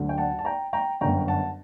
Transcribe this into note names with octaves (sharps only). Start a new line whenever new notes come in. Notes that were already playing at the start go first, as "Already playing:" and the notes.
Already playing: D2 D3 F#3
G5
F#5 A5
A5
G5 A#5
G5 A#5
G1 F#2 D3 G5 A#5
F#5 A5